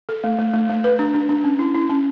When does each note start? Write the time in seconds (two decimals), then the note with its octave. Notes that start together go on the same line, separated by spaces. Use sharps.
0.09 A4
0.24 A3
0.39 A3
0.53 A3
0.69 A3
0.84 B4
0.99 D4
1.14 D4
1.29 D4
1.44 C#4
1.59 E4
1.75 E4
1.90 C#4